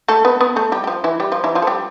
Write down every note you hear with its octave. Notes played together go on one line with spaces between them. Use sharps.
A3 A4
B3 B4
B3 B4
A3 A4
G3 G4
G4
F3 F4
E3 E4
G3 G4
F3 F4
E3 E4
F3 F4
A4
G3 G4